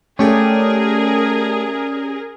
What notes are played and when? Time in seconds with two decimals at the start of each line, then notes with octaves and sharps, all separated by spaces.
0.19 A3 C#4 G4 G#4 A#4 D5